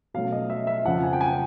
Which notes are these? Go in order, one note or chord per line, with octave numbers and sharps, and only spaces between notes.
B2 F#3 A3 C#4 F5
D#5
E5
E5
F2 C#3 F3 F#5
G#5
G5
G#5